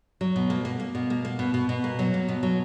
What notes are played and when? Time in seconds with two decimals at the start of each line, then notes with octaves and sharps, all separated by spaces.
0.21 F#3
0.36 B2
0.50 A#3
0.65 A#3
0.80 A#3
0.95 B2
1.10 A#3
1.25 A#3
1.39 B2
1.54 B2
1.69 B2
1.84 A#3
1.99 F#3
2.14 A#3
2.28 B2
2.43 F#3